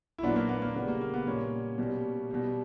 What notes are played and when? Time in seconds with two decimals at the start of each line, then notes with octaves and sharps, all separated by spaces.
0.18 E4
0.23 A#2 F#3 B3 D4
0.36 A#3
0.49 B3
0.62 A#3
0.75 C#3 G3 B3
0.88 A#3
1.01 A#3
1.14 B3
1.26 A#2 G3 A#3 C#4
1.78 B2 G3
2.30 B2 G3